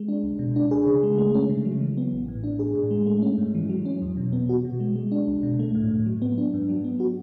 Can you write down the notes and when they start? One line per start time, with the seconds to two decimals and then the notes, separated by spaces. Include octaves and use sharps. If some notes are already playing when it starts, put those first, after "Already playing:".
Already playing: G#3
0.08 D4
0.23 C#2
0.39 B2
0.56 D4
0.71 G#4
0.86 C#3
1.03 G#3
1.18 A3
1.34 C#4
1.49 C#3
1.65 F#3
1.81 E3
1.97 B3
2.12 A1
2.28 A2
2.44 D4
2.59 G#4
2.75 A2
2.91 G#3
3.07 A3
3.22 C#4
3.38 G#2
3.55 E3
3.69 F#3
3.85 C#4
4.02 E2
4.17 B2
4.32 B3
4.49 F#4
4.65 B2
4.80 G#3
4.96 G#3
5.12 D4
5.28 C#2
5.43 B2
5.59 A3
5.75 A2
5.91 A2
6.06 F#3
6.22 B3
6.38 D4
6.54 G#2
6.69 F#3
6.84 B3
7.00 F#4